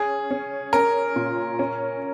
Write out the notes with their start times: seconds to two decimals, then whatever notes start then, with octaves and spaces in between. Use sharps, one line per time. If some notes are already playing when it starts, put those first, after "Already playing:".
Already playing: C#4 G#4
0.31 C#4
0.73 C#4 A#4
1.16 A#2
1.59 C#4